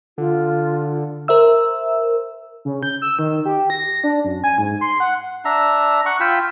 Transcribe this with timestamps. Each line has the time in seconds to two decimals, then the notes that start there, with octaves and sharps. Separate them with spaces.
0.18 D3 F4
1.28 A#4 C5 E5 E6
2.65 C#3
2.83 G6
3.02 E6
3.19 D#3
3.45 G4
3.70 A#6
4.04 D4
4.25 F#2
4.44 G#5
4.58 G#2
4.81 C6
5.00 F#5
5.45 D4 E5 A#5
6.06 F#5 C#6
6.20 F4 G5 B5 E6